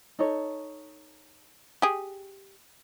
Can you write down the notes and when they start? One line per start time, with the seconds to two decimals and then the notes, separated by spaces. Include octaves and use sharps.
0.19 D#4 A4 C#5
1.82 G4 G#4